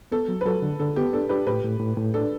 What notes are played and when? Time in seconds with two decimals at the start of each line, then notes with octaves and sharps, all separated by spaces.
0.12 B3 A4
0.28 F#3
0.41 B4
0.46 F#3 A4
0.62 D3
0.80 D3 A4
0.96 B3 G4
1.13 D4 A4
1.29 D4 G4 B4
1.47 A2 G4 B4
1.64 A2
1.80 A2
1.97 A2
2.14 D4 A4